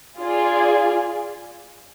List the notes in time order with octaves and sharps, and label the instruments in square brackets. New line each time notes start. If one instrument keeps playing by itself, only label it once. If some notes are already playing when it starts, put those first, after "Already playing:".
[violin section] F4 G#4 D5